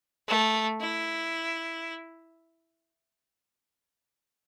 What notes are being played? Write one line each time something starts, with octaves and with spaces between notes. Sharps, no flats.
A3
E4